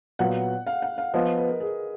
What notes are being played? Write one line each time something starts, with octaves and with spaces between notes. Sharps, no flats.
A#2 F#3 B3 F4 F#5
F5
F#5
F5
F3 B3 F4 D#5
D#5
B4
A#4
G#4